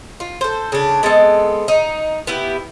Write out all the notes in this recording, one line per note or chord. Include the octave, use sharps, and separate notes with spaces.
F4
A4 C5
C#3 D4
G#3 B3 C4 A4
D#4
B3 E4 G4